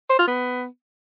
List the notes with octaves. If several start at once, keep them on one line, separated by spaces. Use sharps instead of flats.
C5
F4
B3